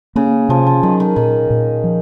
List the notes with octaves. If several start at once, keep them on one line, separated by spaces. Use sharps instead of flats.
C#3 A#3
C3 F3
F3
D#3 F#3
D#3
A#2 D#3
A#2
F3